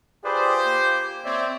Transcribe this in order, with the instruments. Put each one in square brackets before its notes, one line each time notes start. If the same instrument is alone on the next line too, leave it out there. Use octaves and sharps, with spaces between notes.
[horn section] F4 G4 C5 [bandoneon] G#4 B4 D5
[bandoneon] A#3
[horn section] C4 [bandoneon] C#5 D5 E5